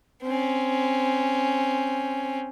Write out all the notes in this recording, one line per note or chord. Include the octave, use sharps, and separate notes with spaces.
C4 C#4